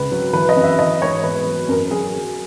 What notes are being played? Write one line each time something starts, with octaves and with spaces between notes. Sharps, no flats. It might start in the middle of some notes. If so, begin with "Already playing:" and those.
Already playing: C#2 B4
F#3
E3 B4
D#5
F#2
E5
E3 D#5
G#2 C#5
E2 B4
F#3
F#2 A#4
F#3 G#4
F#3